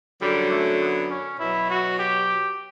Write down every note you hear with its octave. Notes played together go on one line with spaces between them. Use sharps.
F#2 D3 F#3 G3
A3
B3
C#4
B2 F#3 E4
F#4
G4